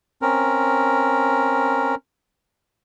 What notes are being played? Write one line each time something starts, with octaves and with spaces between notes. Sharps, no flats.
C4 C#4 A#4